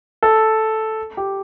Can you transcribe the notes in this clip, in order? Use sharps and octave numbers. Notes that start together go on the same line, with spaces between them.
A4
G4